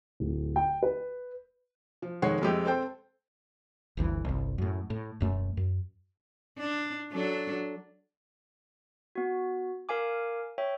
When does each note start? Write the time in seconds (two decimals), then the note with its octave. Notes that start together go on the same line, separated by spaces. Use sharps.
0.20 D1
0.56 G5
0.83 B4
2.02 F3
2.22 F1 D#3 G#3 C#5 F#5 C7
2.42 F2 G#3 A3 G4
2.66 C4 A4 C5 G5
3.97 G1 D2 B2 E3
4.25 G1 C2
4.58 F#2 A2
4.90 A2
5.20 E1 F#2 A3
5.57 F#2
6.58 D4
7.12 F#3 D4 A4
9.15 B3 F#4
9.89 A#4 F5 G#5 D6
10.58 C#5 E5 G5